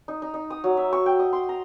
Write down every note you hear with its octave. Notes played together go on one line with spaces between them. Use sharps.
D#4
D#4
D#4
D#6
F#3
E5
C#6
G5
D#5
C6
A#5